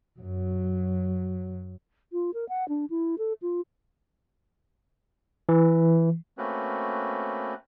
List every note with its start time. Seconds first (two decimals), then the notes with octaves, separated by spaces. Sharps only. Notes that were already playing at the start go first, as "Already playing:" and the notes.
0.20 F#2 F#3
2.13 F4
2.34 A#4
2.49 F#5
2.68 D4
2.90 E4
3.18 A4
3.42 F4
5.49 E3
6.38 A3 A#3 C4 C#4 F#4 B4